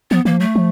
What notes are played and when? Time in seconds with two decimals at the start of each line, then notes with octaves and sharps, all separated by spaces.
0.11 F3 B3
0.25 E3 A#3
0.33 F3
0.40 F#3 A3
0.55 F3